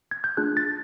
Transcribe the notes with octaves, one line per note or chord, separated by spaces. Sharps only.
G#6
G6
A3 D4 F4 G#4 F#6
A6